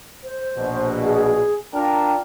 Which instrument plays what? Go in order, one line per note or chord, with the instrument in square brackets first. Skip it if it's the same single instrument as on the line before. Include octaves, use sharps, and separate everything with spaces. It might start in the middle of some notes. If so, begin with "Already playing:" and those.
[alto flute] C5
[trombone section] A#1 B2
[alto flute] G#4
[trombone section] D4 F4 A#4 [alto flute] G5